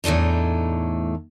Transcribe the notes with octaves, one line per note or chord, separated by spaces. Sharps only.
E2 A2 A3 D4 D#4